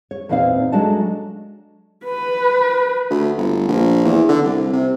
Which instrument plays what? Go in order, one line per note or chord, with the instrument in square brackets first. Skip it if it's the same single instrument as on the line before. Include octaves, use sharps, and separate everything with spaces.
[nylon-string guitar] C#5
E2 A#2 A#3 C4 D#4 F5
F#3 G#3 A3 D4 F#4 A5
[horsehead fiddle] B4
[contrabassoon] D2
G1
A#1
E2
D3
C2
C3